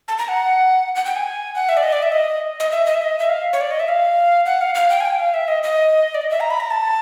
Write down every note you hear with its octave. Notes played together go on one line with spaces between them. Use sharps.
A5
A#5
F#5
F#5
G5
G#5
F#5
E5
D5
D#5
D5
E5
D#5
D#5
E5
D#5
E5
D#5
E5
F5
C#5
D5
D#5
E5
F5
F#5
F5
F5
G5
G#5
G5
F5
E5
D#5
D#5
D5
D#5
E5
A#5
B5
A#5
A5